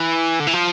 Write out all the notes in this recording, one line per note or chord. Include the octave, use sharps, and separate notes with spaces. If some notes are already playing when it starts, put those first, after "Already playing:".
Already playing: E3
D3
E3
F3